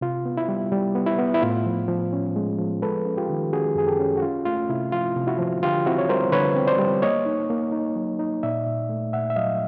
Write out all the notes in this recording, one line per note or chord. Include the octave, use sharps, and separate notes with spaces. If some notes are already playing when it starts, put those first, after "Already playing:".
C3 F4
B3
E4
G3
G3
B3
E4
B3
E4
A2 F4
F3
F3
C#4
G#3
F3
G#3 A4 B4
C#4
F4 G4
D#3
C#4 F#4 G#4
F#2 G#4
G4 A4
C#4
F#4
C#4 F4
A3 F4
C3 E4
F3 F4
C3
E4 F#4
F3
D3 F4 G4
C4 E4 F#4
C#5
G3 A#4 C5
D3 B4 C#5
C4
C5 D5
G3
A#3 C#5 D#5
D#4
A#3
D#4
F#3
D#4
A#2 D5 E5
A#2
A3
A#2 E5 F#5
E5
F#3 D#5 F5